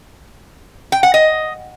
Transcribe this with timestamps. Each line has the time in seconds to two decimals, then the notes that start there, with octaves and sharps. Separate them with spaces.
0.92 G5
1.03 F#5
1.14 D#5